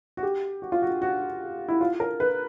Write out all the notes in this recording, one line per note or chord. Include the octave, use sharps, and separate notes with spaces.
F#4
G4
F#4
F4
F#4
F#4
E4
F4
A#4
B4